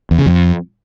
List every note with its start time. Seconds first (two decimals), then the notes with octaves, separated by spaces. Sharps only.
0.11 E2
0.19 C#3
0.26 F2